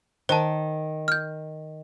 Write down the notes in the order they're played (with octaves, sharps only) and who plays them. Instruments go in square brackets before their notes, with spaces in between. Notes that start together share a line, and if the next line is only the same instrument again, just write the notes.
[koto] D#3 [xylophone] C5 A5
[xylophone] F6 G6